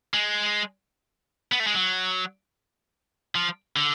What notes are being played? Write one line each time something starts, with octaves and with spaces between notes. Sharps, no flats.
G#3
B3
A3
G#3
F#3
F3
D3